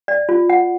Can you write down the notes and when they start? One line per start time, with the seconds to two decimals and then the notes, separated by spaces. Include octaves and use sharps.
0.08 D5
0.29 F4
0.50 F#5